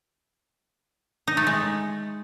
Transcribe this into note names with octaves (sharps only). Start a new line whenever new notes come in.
D#4
A3
G#3